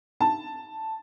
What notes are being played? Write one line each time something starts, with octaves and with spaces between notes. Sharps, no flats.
A5